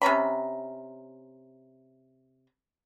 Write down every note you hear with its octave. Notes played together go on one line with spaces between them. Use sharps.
C3 C#4 A#5 B5